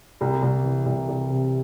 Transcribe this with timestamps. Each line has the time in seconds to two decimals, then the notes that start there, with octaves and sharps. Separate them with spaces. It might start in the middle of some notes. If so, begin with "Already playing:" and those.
0.21 C2
0.42 C2
0.64 E3
0.86 C2
1.08 C2
1.29 C3